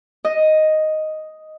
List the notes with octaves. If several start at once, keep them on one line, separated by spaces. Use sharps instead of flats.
D#5